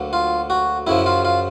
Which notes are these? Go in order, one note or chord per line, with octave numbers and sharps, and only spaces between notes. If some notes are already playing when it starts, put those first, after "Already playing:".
Already playing: D2 D3 F#3 A#3
F4
F#4
F#2 C#3 F3 E4
F4
F4